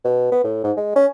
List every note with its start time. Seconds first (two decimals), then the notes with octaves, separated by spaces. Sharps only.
0.04 B2
0.32 B3
0.44 A2
0.64 G#2
0.77 G#3
0.96 C#4